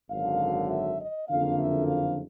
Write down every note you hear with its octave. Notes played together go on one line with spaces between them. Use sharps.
G#1 F#2 D3 F#3 F5
E5
D#5
F#1 F2 D3 F3 A#3 F5
E5
F5